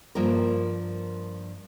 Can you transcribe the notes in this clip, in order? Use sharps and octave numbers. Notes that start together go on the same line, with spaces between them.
G2 F3 A#3 A#4